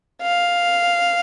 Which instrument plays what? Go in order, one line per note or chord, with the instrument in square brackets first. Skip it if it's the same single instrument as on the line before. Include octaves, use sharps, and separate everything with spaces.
[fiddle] F5